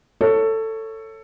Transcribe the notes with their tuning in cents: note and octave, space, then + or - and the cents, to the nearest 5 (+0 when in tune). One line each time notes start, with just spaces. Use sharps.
A4 +15 C#5 +0